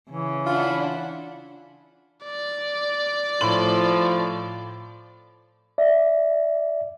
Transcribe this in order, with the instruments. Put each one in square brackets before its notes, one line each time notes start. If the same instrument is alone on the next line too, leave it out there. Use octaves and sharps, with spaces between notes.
[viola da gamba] C#3 [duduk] E3
[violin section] D4 E4 F#5 [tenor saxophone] F4
[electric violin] D5
[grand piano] A2 C6 F#7 [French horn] F3
[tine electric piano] D5 E5